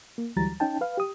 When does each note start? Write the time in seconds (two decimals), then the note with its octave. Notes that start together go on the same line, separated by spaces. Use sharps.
0.18 A#3
0.36 D2 E3 F#3 G3 A#5 A6
0.60 C#4 D#4 G5 A5
0.81 B4 F5
0.97 G4 D#6